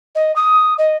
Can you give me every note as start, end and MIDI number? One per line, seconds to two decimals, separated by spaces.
0.15 0.34 75
0.36 0.74 87
0.78 0.97 75